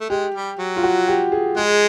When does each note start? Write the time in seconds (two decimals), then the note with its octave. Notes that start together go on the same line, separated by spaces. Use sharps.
0.01 A3
0.09 G#3 G4
0.34 G3
0.59 F#3
0.76 F4
0.83 F#4
1.08 G4
1.32 G#4
1.57 G#3 G#4